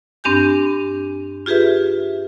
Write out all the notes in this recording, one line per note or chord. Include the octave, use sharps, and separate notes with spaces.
G2 C4 D4 G4 G#5 G6
F4 G4 G#4 B4 E5